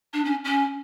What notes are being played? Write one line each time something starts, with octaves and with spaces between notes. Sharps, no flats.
D4
C#4
C#4